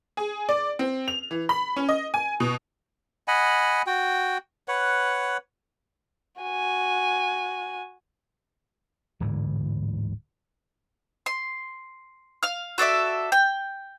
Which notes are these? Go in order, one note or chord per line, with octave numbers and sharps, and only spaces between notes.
G#4
D5
C4
F7
E3
B5
C#4
D#5
G#5
B2
D#5 F#5 G#5 B5
F#4 G5
B4 C#5 F#5
F#4 G#5
D1 G#2 D3 E3
C6
F5 F6
F#4 A4 D5 E5
G5